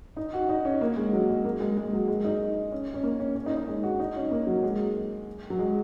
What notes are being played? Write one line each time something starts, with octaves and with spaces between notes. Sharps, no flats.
D#4
F#4
D#4
C#4
A#3
G#3
F#3
G#3
A#3
G#3
G#3
F#3
G#3
D#4
C#4
C#4
A#3
C#4
C#4
D#4
D#4
G#3
F#4
D#4
C#4
A#3
F#3
G#3
F#3
G#3